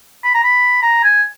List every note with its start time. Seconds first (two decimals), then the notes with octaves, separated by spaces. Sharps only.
0.25 B5
0.35 A#5
0.44 B5
0.83 A#5
1.04 G#5